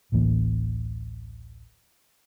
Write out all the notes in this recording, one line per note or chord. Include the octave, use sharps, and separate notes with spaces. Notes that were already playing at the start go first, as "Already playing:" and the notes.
D1 A1 E3 A#3